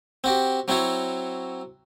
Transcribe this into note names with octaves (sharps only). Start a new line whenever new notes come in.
C4 F#4 G4
F#3 C4 E4 F#4 C#5